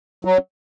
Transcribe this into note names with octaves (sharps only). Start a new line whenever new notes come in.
F#3